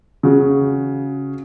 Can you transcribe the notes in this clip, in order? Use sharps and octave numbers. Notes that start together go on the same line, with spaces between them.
C#3 F#4